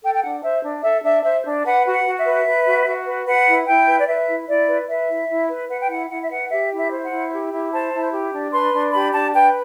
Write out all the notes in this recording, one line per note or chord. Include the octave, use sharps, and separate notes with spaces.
A4 G5
G5
D4 F#5
C5 E5
D4
A4 E5
D4 E5
C5 E5
D4
B4 F#5
F#4
F#5
F#4
E5
B4
B4
F#4
F#4
B4
B4 F#5
E4
E4 G5
B4
D5
B4 E5
E4
E4 D5
B4
B4 E5
E4
E4
B4
B4 F#5
G5
E4 F#5
E4 F#5
E5
B4 F#5
G4 E5
E4
E5
C5
F#5
E4
G4
E4
C5 A5
E4
G4
D4
B4 C6
D4
G4 B5
D4 A5
B4 G5